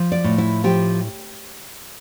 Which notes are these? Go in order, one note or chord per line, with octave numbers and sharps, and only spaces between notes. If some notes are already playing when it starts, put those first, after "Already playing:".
Already playing: F3
D5
A2
E4
F3 G4